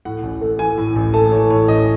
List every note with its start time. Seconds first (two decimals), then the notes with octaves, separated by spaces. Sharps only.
0.05 A2 F#5
0.23 A1
0.41 A3
0.59 E3 G#5
0.78 A2
0.96 A1
1.14 A3 A5
1.32 E3 C#5
1.50 A2 C#5
1.68 A1 D#5